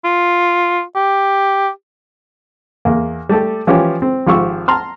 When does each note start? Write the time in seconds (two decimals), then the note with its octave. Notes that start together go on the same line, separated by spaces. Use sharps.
0.05 F4
0.96 G4
2.85 E2 A#3
3.29 G3 A3 G4 A4
3.67 E3 F3 C#4 G4
4.02 C4
4.27 G#1 F3 G4 C#6 E6
4.68 A5 A#5 C6 F6